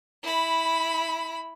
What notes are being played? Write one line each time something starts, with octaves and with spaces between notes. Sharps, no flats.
E4 B5